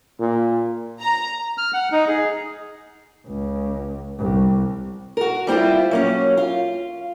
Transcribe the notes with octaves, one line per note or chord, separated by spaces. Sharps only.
A#2
A#5
F6
F#5
D#4
G#4
C#2
C2
F#4 A#4
G3 C4 E4 F4
F#3 A#3 C#4
F4 F5